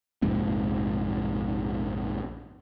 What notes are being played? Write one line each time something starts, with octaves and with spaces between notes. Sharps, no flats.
A#1 F2 G#2 C3